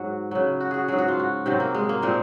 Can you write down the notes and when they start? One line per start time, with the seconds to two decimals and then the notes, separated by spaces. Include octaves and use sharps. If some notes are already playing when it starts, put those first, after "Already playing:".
Already playing: G#2 F#3 F#4
0.31 C#3 F#3
0.60 F#4
0.71 F#4 G#4
0.88 G#2 F#3 G#4
0.98 F#4
1.08 F4
1.19 F#4
1.46 C3 D#3 F#3 C4
1.60 A#3
1.74 G#3
1.89 A#3
2.02 A#2 F3 G#3 C4